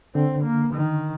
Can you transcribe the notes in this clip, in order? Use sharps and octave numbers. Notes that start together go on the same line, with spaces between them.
D3 C4
A#3
D#3